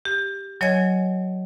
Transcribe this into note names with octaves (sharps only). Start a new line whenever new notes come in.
G4
F#3 C#5 D#5 G#5 G#6